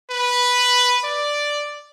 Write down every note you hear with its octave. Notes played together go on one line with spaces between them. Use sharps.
B4
D5